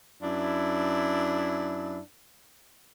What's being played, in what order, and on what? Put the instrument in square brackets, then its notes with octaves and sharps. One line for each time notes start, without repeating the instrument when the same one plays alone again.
[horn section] F#2 D4 E4